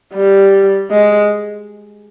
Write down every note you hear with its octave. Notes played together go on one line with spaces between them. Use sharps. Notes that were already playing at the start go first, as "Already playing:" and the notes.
G3
G#3